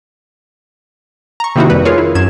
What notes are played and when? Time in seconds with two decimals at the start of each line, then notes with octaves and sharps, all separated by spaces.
1.40 A#5 C#6
1.56 C3 D#3 A#3 D#4 E4 F#4
1.70 F2 G3 B4
1.85 F4 G#4 A#4 C#5
1.98 E4
2.15 F#2 G#6 E7